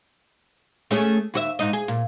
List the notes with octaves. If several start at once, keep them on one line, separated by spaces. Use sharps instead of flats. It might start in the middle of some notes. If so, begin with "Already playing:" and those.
A3 C#4 G#4
D#2 F#4 E5
G#2 D#4 D#5
G#4
A#2